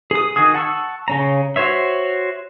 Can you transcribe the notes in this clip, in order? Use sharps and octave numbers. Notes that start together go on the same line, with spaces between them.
G#4 D#6
D#3 F#4 G#4 D#6
F#5 A5 C#6 E6
C#3 C#4 A#5
F#4 C5 C#5 E5